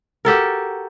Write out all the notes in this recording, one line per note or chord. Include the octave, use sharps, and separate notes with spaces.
F#4 G4 A4 A#4